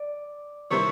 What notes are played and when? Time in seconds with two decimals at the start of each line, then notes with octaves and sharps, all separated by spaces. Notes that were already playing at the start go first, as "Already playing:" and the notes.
Already playing: D5
0.70 C3 D#3 G3 C4 E4 C#5